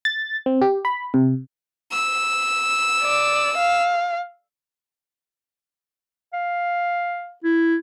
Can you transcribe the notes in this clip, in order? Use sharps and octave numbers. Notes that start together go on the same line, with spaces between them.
A6
C4
G4
B5
C3
E6
D5
F5
F5
E4